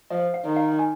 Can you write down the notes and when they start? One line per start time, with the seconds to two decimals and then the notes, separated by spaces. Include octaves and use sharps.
0.10 F3 D#5
0.34 F5
0.45 D#3
0.57 F5
0.79 G#5